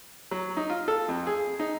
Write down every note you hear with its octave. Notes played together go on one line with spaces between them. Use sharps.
F#3
D#4
F4
A4
F2
G#4
D#4